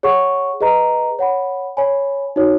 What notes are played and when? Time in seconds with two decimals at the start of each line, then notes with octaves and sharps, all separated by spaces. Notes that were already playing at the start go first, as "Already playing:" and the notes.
0.03 G#4 C#5 F#5 C#6
0.61 G#4 B4 D#5 A#5
1.19 C#5 F#5 B5
1.77 C#5 G#5 B5
2.36 D#4 F#4 C#5